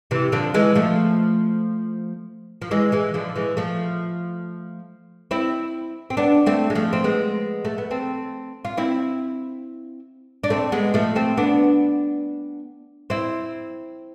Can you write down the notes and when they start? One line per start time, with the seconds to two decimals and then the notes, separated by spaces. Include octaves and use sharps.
0.11 C3 E3
0.32 D3 F3
0.54 E3 G#3
0.75 F3 A3
2.62 F3
2.71 E3 G#3
2.92 E3 G#3
3.14 D3 F3
3.36 E3 G#3
3.57 F3 A3
5.31 C4 E4
6.10 C4
6.17 B3 D4
6.46 A3 C4
6.70 G#3
6.75 F3 A3
6.93 C4
7.04 G#3 B3
7.65 A3
7.78 B3
7.91 A3 C4
8.65 F4
8.77 C4 E4
10.44 D4
10.50 A3 C4
10.72 G#3 B3
10.94 F3 A3
11.16 A3 C4
11.37 B3 D4
13.10 C4 E4